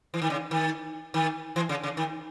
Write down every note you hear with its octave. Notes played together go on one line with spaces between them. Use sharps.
E3
D#3
C#3
D#3
D#3
E3
C#3
C#3
D#3